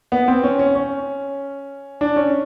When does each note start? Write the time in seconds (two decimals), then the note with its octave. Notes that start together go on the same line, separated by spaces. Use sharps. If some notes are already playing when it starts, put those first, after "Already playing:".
0.12 B3
0.28 C4
0.43 C#4
0.59 C#4
0.75 C#4
2.01 D4
2.16 C#4